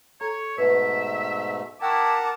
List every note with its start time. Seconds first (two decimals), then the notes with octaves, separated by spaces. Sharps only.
0.21 A4 C#5 A#5
0.58 G#2 B2 A3 B4 E5
1.82 E4 A#4 F#5 G5 A5 A#5 C#6 D6